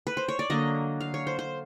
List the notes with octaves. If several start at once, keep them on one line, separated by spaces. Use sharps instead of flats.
B4
C5
C#5
D5
D3 F#3 A#3 D#5
F5
C#5
C5
C5